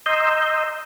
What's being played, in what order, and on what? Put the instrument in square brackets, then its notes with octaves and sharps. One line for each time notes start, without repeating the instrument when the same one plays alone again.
[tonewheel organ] D#5 A#5 C6 D#6 E6 G6